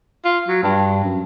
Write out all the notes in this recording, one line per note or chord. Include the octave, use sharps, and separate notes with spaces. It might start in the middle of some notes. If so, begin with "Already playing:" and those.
F4
F#3
G2
F#2